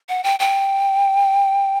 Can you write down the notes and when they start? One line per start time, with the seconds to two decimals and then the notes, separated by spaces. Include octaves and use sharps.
0.09 F#5
0.24 G5
0.40 G5